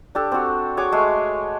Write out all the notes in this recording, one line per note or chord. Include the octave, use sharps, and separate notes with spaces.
D4 G4 A4
C4 F#4
F#4 G#4 C#5 D6
G#3 A3